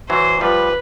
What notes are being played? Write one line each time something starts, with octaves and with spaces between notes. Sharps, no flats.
E3 F#3 C5
F3 G3 B4